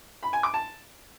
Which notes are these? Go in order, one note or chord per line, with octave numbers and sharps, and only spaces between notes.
B5
G#5
D6
A5